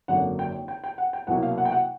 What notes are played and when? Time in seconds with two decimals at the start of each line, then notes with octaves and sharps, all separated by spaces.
0.08 G#1 F#2 D3 F#3 A#3 F#5
0.39 G5
0.68 G5
0.84 G5
0.98 F#5
1.13 G5
1.27 C2 B2 F#3 A#3 F#5
1.43 F5
1.58 F#5
1.65 G5
1.72 F#5